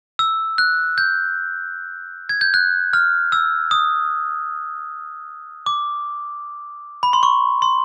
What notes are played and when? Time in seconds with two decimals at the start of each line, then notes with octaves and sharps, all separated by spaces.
0.19 E6
0.58 F#6
0.98 G6
2.29 G#6
2.41 G6
2.54 F#6
2.93 F6
3.32 E6
3.71 D#6
5.66 D6
7.03 B5
7.13 C6
7.23 C#6
7.62 C6